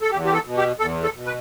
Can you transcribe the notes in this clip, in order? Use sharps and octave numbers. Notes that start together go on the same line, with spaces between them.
A4
E2 G4
G4
A4
B2
G4
E2 A4
A4
B2
B4